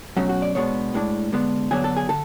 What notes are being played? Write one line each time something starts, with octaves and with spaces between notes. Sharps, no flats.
B2 F#3 A3 C#4 F#4
F#4
D5
B2 G#3 B3 D4 C#5
A2 G#3 D4
D3 G#3 B3 D4
D3 F#3 B3 D4 G#4
A4
G#4
D3 A4